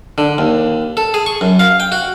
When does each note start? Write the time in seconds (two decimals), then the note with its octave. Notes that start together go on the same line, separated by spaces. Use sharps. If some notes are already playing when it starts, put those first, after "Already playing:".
0.18 D3
0.38 D#2
0.97 A4
1.14 G#4
1.26 C#6
1.41 F#2
1.59 F5
1.80 G5
1.92 F#4